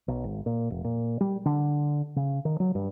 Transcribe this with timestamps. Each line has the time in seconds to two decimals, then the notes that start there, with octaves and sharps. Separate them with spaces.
0.08 B1
0.24 G#1
0.46 A#2
0.70 F1
0.84 A#2
1.21 G3
1.45 D3
2.16 C#3
2.45 D#3
2.60 F#3
2.75 G2